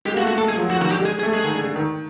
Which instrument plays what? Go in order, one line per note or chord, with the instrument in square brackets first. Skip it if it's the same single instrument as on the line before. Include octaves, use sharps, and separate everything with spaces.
[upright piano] G#3 [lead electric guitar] G4
[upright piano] A#3
[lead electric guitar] F#4
[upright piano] A3
[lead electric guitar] F#4
[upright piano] A3 [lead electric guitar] A4
[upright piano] G#3 [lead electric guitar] G#4
[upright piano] F3
F#3
[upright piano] F3 [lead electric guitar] F#4
[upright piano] D#3 [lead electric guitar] F#4
[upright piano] D3 [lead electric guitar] G4
[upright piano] G#3 [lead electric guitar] G#4
[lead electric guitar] G#4
[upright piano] A3
[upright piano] G#3 [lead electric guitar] G#4
[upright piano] D#3
D3
D3
D#3